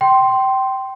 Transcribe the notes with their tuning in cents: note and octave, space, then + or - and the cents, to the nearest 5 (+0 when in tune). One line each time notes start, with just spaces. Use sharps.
G5 -20 C6 +0